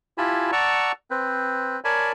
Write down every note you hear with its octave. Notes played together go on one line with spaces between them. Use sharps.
E4 F4 G4 G#5 A5 B5
D5 F#5 A5 A#5 C#6 E6
C4 B4 C5
A#4 C#5 D5 G#5 A5 B5